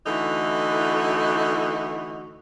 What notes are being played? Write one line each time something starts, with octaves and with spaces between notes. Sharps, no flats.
D3 E3 A3 D#4 E4 F#4